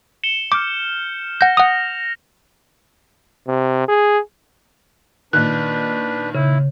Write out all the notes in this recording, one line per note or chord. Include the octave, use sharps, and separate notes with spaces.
C#7 E7 G7
D6 F6 G6
F#5 G6 A#6
F#5 D#6 F7
C3
G#4
A#2 D#3 D4 B4 F#6
C#3 E4